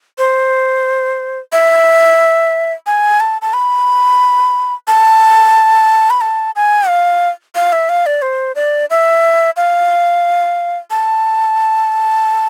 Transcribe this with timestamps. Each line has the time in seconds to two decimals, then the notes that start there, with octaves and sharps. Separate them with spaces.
0.18 C5
1.52 E5
2.87 G#5
3.20 A5
3.42 A5
3.54 B5
4.87 A5
6.10 B5
6.21 A5
6.56 G#5
6.88 F5
7.55 F5
7.72 E5
7.89 F5
8.06 D5
8.22 C5
8.55 D5
8.90 E5
9.57 F5
10.91 A5